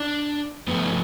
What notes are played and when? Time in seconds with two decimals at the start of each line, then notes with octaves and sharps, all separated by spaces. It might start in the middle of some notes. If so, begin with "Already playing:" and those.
Already playing: D4
0.68 G2 F3 A3 B3